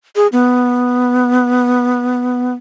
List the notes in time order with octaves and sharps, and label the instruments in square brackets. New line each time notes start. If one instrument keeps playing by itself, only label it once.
[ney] G#4
B3